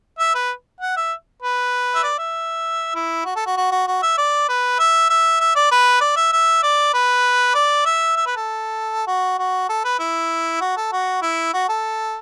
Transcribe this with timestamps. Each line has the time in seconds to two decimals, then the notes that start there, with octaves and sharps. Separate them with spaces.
0.19 E5
0.35 B4
0.81 F#5
0.97 E5
1.43 B4
1.95 E5
2.03 D5
2.19 E5
2.95 E4
3.25 F#4
3.36 A4
3.46 F#4
3.57 F#4
3.72 F#4
3.87 F#4
4.03 E5
4.18 D5
4.49 B4
4.80 E5
5.10 E5
5.40 E5
5.56 D5
5.71 B4
6.01 D5
6.16 E5
6.33 E5
6.63 D5
6.94 B4
7.55 D5
7.86 E5
8.17 E5
8.26 B4
8.36 A4
9.07 F#4
9.39 F#4
9.69 A4
9.85 B4
9.99 E4
10.61 F#4
10.77 A4
10.92 F#4
11.22 E4
11.54 F#4
11.69 A4